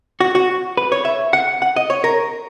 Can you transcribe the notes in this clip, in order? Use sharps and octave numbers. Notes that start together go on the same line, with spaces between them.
F#4
F#4
B4
C#5
E5
F#5
F#5
D#5
C#5
A#4